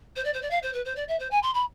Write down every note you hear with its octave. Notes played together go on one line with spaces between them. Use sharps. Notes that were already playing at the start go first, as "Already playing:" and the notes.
C5
D5
C5
D5
F5
C5
B4
C5
D5
E5
C5
G#5
C6
B5